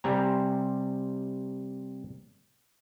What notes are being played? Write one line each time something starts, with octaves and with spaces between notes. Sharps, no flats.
C3 G3 C4 G#5 A#5